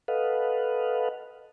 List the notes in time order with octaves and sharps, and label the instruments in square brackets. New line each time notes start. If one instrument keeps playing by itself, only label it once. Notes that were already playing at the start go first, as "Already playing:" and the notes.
[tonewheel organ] A4 B4 D#5 F5 F#5